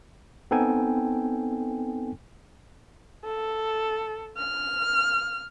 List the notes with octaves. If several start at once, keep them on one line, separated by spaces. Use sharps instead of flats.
B3 C4 D#4 A4 G5 G#5
A4
F6